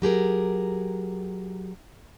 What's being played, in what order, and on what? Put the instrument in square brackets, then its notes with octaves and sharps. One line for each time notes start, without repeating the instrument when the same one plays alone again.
[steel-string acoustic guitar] F#3 G4 G#4 A#4